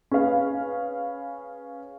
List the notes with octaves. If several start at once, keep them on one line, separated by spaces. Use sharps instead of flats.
C#4 G#4 B4 F5